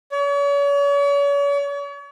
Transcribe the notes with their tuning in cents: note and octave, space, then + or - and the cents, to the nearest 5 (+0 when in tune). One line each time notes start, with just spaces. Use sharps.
C#5 +40